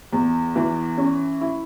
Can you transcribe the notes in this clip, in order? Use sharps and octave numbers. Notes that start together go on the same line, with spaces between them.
E2
E3
C#4
E4